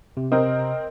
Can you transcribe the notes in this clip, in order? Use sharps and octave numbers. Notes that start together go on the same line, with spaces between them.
C3
C4 A#4 D#5